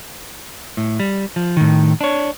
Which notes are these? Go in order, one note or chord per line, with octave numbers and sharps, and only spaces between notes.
A2
G3
F3
A2 D#3
D4 C#5